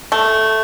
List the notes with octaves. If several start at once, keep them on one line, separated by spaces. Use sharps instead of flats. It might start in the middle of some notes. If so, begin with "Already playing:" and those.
A3